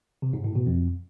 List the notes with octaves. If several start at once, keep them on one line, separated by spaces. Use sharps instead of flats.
C3
G#2
A2
B2
F2